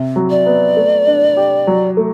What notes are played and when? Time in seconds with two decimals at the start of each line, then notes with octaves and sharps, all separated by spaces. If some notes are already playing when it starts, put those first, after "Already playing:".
Already playing: C3
0.16 F#3
0.30 D5
0.46 B3
0.77 A3
1.07 D4
1.37 G4
1.67 F#3
1.97 A3